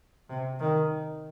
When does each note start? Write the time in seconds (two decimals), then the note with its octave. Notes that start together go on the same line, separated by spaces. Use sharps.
0.30 C3
0.59 D#3